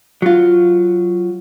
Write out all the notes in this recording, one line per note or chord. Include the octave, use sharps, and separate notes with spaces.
F#3 F4